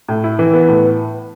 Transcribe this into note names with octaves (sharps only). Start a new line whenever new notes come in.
A2
E4
E3
B3
A2